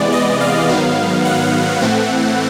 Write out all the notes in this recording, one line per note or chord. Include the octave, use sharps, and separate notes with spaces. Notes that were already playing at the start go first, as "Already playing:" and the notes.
Already playing: C3 E3 G#3 B3 D5
D#5
F5
G#2 D#3 F#3 B3
F#5
A2 E3 A3 C4